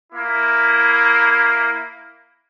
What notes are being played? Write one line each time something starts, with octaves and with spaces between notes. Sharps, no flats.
A#3 E4